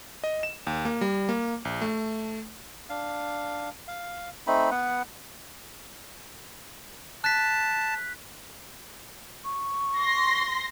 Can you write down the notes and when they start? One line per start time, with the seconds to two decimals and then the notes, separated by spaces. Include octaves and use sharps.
0.24 D#5
0.43 E7
0.67 D#2
0.85 A#3
1.01 G3
1.29 A#3
1.65 A#1
1.82 A3
2.90 D4 F5
3.88 F5
4.47 A3 C4 D#4 B5
4.71 B3 B4 F#5
7.24 A5 F#6 B6
9.44 C#6
9.98 C6 A#6